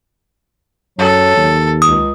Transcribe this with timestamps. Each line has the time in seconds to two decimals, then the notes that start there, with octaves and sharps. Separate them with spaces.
0.99 F#2 F#3 A4
1.37 D#2
1.82 C#2 D#6